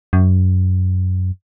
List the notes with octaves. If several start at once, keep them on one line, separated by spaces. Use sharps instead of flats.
F#2